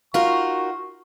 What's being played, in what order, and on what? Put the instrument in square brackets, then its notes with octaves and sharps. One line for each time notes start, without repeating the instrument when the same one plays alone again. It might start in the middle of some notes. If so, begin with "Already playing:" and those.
[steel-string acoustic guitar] D#4 F#4 A#4 [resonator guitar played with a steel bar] F4 [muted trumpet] C#6